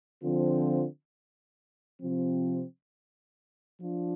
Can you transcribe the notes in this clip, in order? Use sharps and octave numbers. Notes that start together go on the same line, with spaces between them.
D3 F3 C4 F4
C3 F3 C4
F3 D4 F4